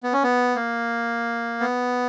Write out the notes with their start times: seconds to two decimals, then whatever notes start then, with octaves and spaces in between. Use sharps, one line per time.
0.03 B3
0.13 C#4
0.23 B3
0.56 A#3
1.60 B3